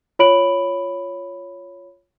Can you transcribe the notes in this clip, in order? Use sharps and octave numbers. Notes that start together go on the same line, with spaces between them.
F4 C#5 B5 D7 F#7